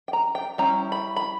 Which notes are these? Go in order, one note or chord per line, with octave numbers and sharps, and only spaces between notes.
G5
A#5
G5
G3 C#4 E4 A#5
B5
B5